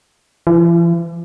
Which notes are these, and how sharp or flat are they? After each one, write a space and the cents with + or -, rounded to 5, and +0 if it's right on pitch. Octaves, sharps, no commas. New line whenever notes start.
E3 +45